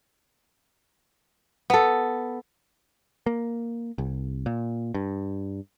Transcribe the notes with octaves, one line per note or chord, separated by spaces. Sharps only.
B3 A4
A#3
C2
A#2
G2